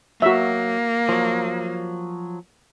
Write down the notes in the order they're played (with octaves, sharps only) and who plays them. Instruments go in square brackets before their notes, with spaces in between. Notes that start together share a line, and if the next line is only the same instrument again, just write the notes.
[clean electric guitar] F#3 [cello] A#3 [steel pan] F#4 E5
[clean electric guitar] F3 F#3